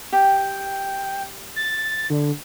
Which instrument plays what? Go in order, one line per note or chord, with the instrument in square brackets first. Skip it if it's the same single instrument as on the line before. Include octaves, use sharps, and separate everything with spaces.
[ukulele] G4 [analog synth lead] G5
[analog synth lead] A6
D3